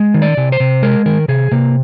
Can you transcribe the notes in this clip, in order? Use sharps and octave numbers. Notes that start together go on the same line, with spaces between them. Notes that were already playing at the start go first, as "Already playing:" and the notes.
Already playing: G#3
D#3
D5
C3
C5
C3
G#3 A#4
D#3 A#4
C3 G#4
C3 A#3